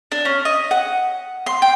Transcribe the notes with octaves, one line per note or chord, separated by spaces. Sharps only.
D4
C#4
D#5
F#5
C6
G5